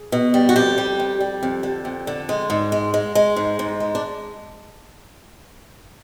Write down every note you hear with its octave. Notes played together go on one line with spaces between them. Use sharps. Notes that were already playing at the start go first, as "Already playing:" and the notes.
Already playing: G#4
B2
G3
F#4
F2 G4
G3
F2
G3
F2
D3
F2
D3
G#3
G#2
G#3
G#3
G#3
G#2
G#2
G#3
D4